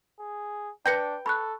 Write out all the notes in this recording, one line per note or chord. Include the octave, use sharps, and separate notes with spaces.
G#4
D4 B4 G5 G6 A#6 C#7
A4 B5 C#6 F#6